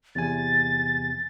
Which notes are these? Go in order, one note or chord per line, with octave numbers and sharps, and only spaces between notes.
E2 C3 G#5 A6